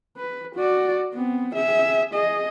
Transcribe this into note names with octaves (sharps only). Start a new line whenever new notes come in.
B4
F#4 D5
B3 C4
G#4 E5
G#4 D#5